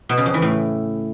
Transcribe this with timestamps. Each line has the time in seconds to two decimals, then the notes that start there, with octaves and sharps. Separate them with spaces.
0.09 B2
0.18 C#3
0.26 F2
0.34 E3
0.42 A2